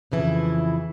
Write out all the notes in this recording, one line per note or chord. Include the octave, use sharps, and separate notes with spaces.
F2 C#3 E3 E4